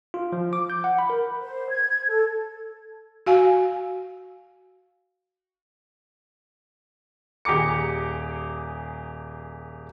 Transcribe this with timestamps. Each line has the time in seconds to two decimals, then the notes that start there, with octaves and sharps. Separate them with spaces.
0.14 F4
0.32 F3
0.53 D6
0.70 G6
0.84 F#5
0.99 B5
1.10 A#4
1.41 C5
1.70 G#6
2.08 A4
3.26 F#4 F5 G#5
7.45 D#1 G4 G#4 A#5 D6 C#7